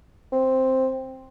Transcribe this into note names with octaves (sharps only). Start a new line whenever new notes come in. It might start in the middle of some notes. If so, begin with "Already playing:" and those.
C4